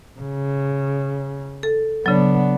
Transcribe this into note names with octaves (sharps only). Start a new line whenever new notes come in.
C#3
A4
C#3 F#3 B3 D4